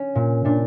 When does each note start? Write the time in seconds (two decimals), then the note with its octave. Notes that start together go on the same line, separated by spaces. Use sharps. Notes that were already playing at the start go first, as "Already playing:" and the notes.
Already playing: C#4
0.15 A#2
0.45 A#2 D4